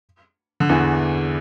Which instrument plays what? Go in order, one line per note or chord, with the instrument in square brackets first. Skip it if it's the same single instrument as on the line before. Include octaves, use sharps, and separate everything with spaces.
[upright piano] D3
E2 E3